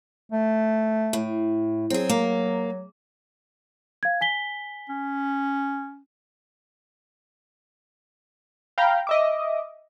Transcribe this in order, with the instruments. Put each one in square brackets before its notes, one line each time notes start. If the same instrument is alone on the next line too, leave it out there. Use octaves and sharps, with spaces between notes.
[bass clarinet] A3
[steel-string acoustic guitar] A2
[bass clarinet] F#3 [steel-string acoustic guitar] C4 G#4
[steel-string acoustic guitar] A#3
[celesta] F5 G#6
G#5 B6 G7
[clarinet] C#4
[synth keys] F5 G5 A#5 B5
D#5 E5 D6